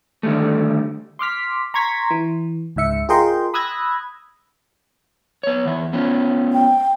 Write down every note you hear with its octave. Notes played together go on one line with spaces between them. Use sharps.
D3 D#3 G3 A3
C6 D6 F6 B6
A#5 C6 C#6 G#6 A#6 B6
E3
C#2 G#2 E5 C#7
F4 G#4 A#4 D#5 G5 C6
B5 D#6 E6 F#6 G#6 A#6
B3 C#5
E2 E3 E5
B3 C#4 F4
G5